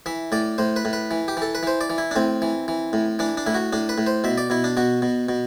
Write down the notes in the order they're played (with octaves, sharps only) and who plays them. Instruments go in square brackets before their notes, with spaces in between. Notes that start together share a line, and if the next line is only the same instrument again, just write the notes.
[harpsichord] E3 E5
A2 D5
A2 C5
B4
A2
B4
E3
G4
E3 A4
B4
E3 C5
D5
E3
E4
D4
A2 C4
E3
E3
A2
E3 D4
D4
A2 E4
F#4
A2 D4
B4
A2
C5
B2 E5
D5
B2 E4
D4
B2 F#4
B2
B2